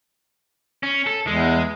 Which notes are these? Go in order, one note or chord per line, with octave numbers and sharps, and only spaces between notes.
C#4
A4
E2 G#3